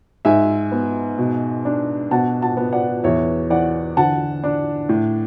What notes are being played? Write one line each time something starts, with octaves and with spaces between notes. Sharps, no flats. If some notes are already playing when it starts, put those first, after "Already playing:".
G#2 E5 G#5
B3
B2
D4
B2 F#5 A5
F#5 A5
B3
D5 F#5
E2 C#5 E5
E3 D5 F#5
D3 F#5 A5
D4
A2